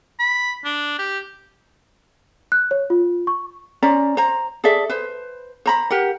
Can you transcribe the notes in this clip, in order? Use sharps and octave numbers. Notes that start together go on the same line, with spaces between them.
B5
D4
G4
F#6
C#5
F4
C#6
C#4 C5 D5 A#5
C5 A#5
G#4 A4 D5 E5
B4 C5
C5 A#5 B5
G4 A#4 F#5